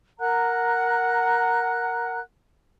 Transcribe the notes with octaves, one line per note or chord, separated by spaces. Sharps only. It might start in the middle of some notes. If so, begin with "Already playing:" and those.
A#4 F#5 A#5 F#6